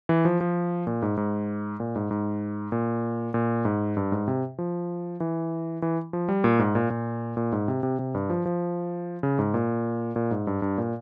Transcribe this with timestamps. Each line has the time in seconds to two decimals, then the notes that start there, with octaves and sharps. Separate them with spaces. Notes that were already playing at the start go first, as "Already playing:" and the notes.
0.09 E3
0.25 F3
0.41 F3
0.87 A#2
1.02 G#2
1.17 G#2
1.80 A#2
1.96 G#2
2.11 G#2
2.72 A#2
3.34 A#2
3.65 G#2
3.97 G2
4.12 G#2
4.28 C3
4.58 F3
5.20 E3
5.82 E3
6.13 F3
6.29 G3
6.44 A#2
6.59 G#2
6.75 A#2
6.90 A#2
7.37 A#2
7.52 G#2
7.68 C3
7.83 C3
7.99 C3
8.15 G2
8.30 F3
8.46 F3
9.23 C#3
9.39 G#2
9.54 A#2
10.16 A#2
10.31 G#2
10.47 G2
10.62 G2
10.78 A#2